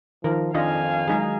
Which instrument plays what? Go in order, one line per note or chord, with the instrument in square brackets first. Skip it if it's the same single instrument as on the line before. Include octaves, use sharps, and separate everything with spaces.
[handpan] D#3 [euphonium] F3 [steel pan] A#4
[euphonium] F2 [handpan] D#3 [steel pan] D4 F4 D#5 [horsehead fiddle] F5 G#5
[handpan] F#3 G#3 [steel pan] D#4 G#4